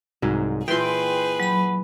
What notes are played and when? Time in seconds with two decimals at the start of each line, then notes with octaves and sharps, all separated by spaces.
0.22 C2 G#2 F#3
0.68 A#2 E3 G#4 B4 G5 C6
1.40 F#3 B5